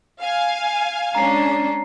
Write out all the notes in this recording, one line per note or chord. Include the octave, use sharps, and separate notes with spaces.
F5 G#5
G#3 C#4 D4 A#5 C7